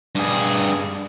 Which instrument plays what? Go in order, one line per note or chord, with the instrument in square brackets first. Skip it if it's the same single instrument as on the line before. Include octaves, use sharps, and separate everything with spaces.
[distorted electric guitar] G2 G#4